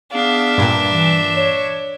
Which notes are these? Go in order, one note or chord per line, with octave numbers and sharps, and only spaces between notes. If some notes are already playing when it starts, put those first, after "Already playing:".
B3 D4 G#4 E5 F5
G2 A#2
E3
C#5